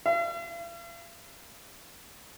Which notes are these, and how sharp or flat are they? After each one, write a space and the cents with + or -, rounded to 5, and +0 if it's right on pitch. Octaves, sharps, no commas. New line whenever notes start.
F5 -45